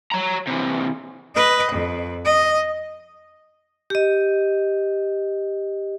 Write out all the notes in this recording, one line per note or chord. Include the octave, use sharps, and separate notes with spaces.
C#5 A#5
C3 E3
B4 D#5
F2
D#5
G4 D#5